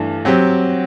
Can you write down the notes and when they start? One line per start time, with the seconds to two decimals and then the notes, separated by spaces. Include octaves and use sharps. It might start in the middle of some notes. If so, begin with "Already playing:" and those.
Already playing: G2 E3 A3 D4
0.25 F#3 C4 G4